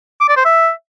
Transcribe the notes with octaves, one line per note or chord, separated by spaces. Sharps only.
D6
D5
C5
E5